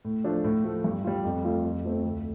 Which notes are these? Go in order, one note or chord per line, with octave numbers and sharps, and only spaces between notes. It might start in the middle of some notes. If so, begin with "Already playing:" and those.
A2
F3 A3 D4
A2
F3 A3
G2
G3 F4
F2
F3 A3 F4
F2
F3 A3 C4
D2